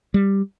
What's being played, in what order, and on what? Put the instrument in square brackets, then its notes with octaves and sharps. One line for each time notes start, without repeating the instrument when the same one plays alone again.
[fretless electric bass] G3